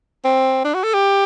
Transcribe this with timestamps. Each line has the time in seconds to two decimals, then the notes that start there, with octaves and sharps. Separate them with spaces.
0.24 C4
0.65 D4
0.74 F#4
0.84 A4
0.94 G4